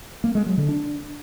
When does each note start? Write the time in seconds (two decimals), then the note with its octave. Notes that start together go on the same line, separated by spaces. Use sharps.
0.24 A#3
0.35 G#3
0.46 F#3
0.57 D3
0.69 D4